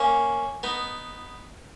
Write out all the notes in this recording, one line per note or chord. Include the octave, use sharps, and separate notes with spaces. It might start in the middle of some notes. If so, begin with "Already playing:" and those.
Already playing: A#3 C#4
B3 D#4